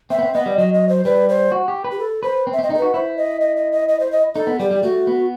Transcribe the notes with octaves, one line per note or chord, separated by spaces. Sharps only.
C4 E5
B3
C4
B3 D#5
G3
F#3 D#5
D#5
C5
G3 B4
C5
F#4
G4
B4
G4
A4
B4 C5
C4
E5
C4 D#5
D#4 A4
F#4 B4
E4 C5
D#5
D#5
D#5
D#5
D#5
C5
D#5
D#4 A4
B3
G3 G4
G3
A3 F#4
B3